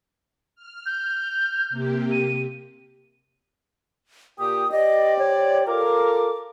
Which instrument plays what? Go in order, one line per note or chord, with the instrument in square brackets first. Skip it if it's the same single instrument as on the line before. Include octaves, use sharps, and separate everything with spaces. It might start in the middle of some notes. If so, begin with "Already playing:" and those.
[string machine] F6
[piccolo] G6
[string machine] C3 A#3 G4
[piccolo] D#7
[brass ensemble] A#2 G4 [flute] D#6
[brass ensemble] G4 C5 D5 [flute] D#5
[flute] C#5
[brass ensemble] F4 A4 A#4 [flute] D6